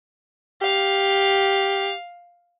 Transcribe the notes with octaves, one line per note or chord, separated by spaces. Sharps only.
G4 F5